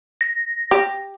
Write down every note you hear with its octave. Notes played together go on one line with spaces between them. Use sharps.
A#6
G4